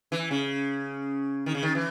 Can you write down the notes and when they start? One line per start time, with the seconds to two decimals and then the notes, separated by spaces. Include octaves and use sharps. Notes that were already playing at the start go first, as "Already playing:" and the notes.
0.12 E3
0.31 C#3
1.46 D#3
1.55 C#3
1.63 D#3
1.75 E3